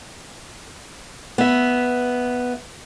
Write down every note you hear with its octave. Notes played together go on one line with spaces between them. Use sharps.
B3 E5